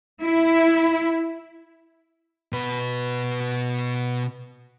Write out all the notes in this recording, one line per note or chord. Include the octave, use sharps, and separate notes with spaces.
E4
B2 B4